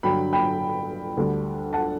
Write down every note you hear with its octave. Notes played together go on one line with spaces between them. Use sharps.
G2 D3 F#3 G5 B5
G5 B5
D2 D3 G3 D4
F#5 A5